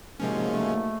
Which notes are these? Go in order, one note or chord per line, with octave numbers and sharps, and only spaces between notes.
G#2 C3 F3 F#3 G#3 A#3 C#4
A3